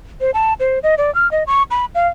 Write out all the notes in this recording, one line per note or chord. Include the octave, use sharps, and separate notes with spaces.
C5
A5
C5
D#5
D5
F6
D#5
C#6
B5
F5